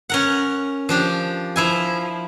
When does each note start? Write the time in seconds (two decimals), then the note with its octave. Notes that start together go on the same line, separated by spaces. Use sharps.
0.09 C#4 A#4 F#5
0.89 F3 D4 G4
1.56 F3 E4 G#5